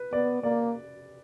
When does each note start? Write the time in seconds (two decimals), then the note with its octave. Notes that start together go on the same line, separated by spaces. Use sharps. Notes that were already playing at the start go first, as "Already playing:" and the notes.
Already playing: B4
0.13 B3 D5
0.43 A#3 D5